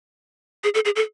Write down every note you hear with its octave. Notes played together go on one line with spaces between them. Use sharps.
G#4
A4
G#4
A4